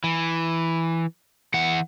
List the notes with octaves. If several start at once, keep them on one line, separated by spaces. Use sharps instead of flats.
E3
E3 F#5